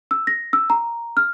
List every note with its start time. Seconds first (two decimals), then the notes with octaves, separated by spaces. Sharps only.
0.11 E6
0.27 A#6
0.53 E6
0.70 A#5
1.17 F6